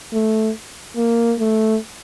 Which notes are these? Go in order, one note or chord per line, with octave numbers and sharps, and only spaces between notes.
A3
A#3
A3